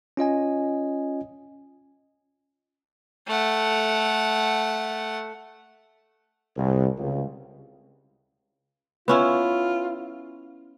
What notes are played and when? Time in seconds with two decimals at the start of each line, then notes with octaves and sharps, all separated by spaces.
0.17 C#4 F4 D#5 G#5
3.27 A3 F#5
6.56 C2
6.98 C#2
9.08 B3 C#4 E4 F4